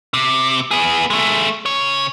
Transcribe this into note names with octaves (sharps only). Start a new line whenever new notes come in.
C3
B3 G#4
G#3 A3
C#3 C#5